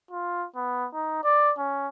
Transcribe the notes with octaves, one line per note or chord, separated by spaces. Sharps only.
F4
B3
D#4
D5
C#4